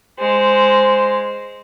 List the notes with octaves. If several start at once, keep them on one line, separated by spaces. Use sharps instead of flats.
G#3 C5